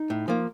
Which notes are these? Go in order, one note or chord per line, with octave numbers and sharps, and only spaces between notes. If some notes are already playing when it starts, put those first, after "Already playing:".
Already playing: D#4
A2
F3 A#3